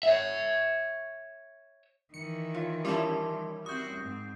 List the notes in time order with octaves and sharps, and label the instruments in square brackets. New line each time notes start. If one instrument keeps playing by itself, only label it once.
[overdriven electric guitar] C#5 E5
[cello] D#3 E3 [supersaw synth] C#7
[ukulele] F4 C#5
[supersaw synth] G3 C#4 E4 [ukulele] F4 A5 [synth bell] A#4 C6 D6
[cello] C4 F#4 [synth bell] D#6 G6
[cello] G#2 C4